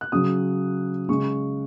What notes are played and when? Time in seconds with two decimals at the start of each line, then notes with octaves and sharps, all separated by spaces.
0.01 F#6
0.12 C#3 F#3 D#6
1.09 C#3 G#3 C#6